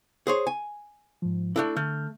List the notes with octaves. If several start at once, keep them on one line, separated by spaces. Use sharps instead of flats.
G#4 C5 C#5
G#5
G#2 F3
A3 D4 E4 A4
D3 A3 F6 G6